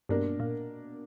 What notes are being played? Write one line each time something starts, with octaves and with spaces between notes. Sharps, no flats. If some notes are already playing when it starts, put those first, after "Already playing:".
G2 B2 A#3 D4 A#4
A#2